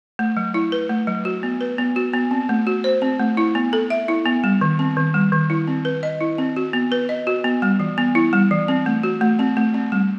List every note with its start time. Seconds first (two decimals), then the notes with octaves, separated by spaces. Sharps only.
0.19 A3
0.37 F#3
0.54 E4
0.72 B4
0.90 A3
1.07 F#3
1.25 F#4
1.43 B3
1.61 B4
1.78 B3
1.96 F#4
2.13 B3
2.31 C4
2.49 A3
2.67 F#4
2.84 C5
3.02 C4
3.19 A3
3.37 E4
3.55 B3
3.73 A4
3.90 E5
4.08 E4
4.26 B3
4.44 G3
4.61 D#3
4.79 C4
4.97 D#3
5.14 G3
5.32 D#3
5.50 E4
5.67 C4
5.85 B4
6.03 D#5
6.20 E4
6.38 C4
6.57 F#4
6.73 B3
6.92 B4
7.09 D#5
7.27 F#4
7.44 B3
7.62 G3
7.80 E3
7.98 B3
8.15 E4
8.33 G3
8.51 E3
8.68 C4
8.86 A3
9.03 F#4
9.21 A3
9.39 C4
9.57 A3
9.74 C4
9.92 G3